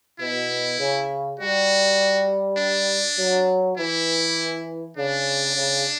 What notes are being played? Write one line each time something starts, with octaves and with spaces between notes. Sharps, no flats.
B2 E4
C#3
G3 F#4
D4
F#3
E3 E4
C#3 D4
C#3